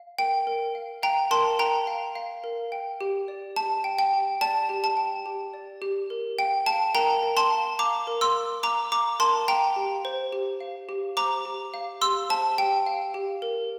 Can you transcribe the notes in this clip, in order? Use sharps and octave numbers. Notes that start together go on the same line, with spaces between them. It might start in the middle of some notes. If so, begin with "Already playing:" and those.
Already playing: F5
A#4 G5
A#4
F5
F5 G5 A#5
A#4 A5 C6
A#4 G5 A#5
F5
F5
A#4
G5
G4
D5
G4 A5
G5
G5
G4
D5 A5
G4
A5
G5
G4
D5
G4
A#4
F5 G5
F5 A5
A#4 G5 A#5
A#4
A5 C6
F5
F5 A#5 D6
A#4
C6 E6
A#4
F5 A#5 D6
F5 A#5 D6
A#4 A5 C6
F5 G5 A#5
G4
C5
G4
F5
G4
C5 A#5 D6
G4
F5
G4 C6 E6
C5 A5
G4 G5
F5
G4
A#4